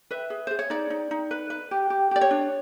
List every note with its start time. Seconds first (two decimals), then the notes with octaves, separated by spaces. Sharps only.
0.11 B4 E5
0.30 G#4
0.47 G#4 C5
0.59 C#5
0.70 D#4 D5
0.90 D#4
1.11 D#4
1.31 B4
1.50 B4
1.71 G4
1.90 G4
2.11 G4 D5
2.21 C#5
2.31 D4